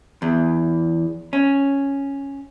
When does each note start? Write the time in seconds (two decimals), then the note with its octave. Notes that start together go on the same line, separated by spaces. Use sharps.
0.22 E2
1.33 C#4